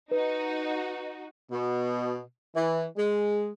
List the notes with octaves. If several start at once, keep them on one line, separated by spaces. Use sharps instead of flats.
D#4 F#4 B4
B2
E3
G#3